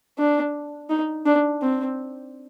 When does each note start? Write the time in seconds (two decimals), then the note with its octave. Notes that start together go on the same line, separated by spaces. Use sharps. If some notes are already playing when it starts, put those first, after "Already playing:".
0.18 D4
0.90 D#4
1.26 D4
1.62 C4